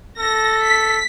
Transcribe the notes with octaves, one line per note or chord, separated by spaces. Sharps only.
A4 A#6
B6